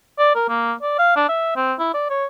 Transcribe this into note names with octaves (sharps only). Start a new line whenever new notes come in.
D5
A#4
A#3
D5
F5
D4
E5
C4
E4
D5
C#5